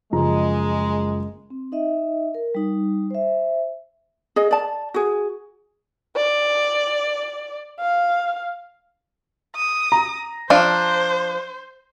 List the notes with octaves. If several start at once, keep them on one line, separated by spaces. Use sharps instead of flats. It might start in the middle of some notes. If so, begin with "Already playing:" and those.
F#1 F3 G#3 A#5
C4
D#4 D#5 E5
A#4
G3 D#4
C5 E5
G#4 D#5
D5 A5
F#4 G#4
D5
F5
D#6
A#5
F3 D4 C5 F5